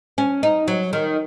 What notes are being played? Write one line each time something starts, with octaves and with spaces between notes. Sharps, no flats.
C#4
D#4
F#3
D#3